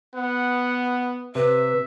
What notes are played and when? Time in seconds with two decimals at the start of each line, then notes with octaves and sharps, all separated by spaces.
0.15 B3 F#5
1.35 C3 B4 E5